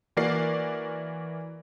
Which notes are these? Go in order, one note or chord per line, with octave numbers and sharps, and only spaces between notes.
E3 A#3 F#4 A#4 D5 C7